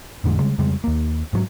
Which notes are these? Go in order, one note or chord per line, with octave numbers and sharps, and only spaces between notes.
A1 F2 D3 G#3
C#3 G3 G#3
F2 C#3 G3 G#3
D#2 A#3
G#2 F3 F#3